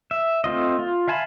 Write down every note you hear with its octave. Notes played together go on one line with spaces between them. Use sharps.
E5
A3 C4 F4 D#5
F4
E5 F5 G#5 A5 B5